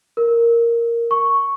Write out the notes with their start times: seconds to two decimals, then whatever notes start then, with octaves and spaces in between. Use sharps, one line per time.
0.17 A#4
1.11 C#6